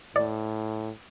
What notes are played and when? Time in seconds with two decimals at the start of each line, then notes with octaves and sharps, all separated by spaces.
0.16 A2 D5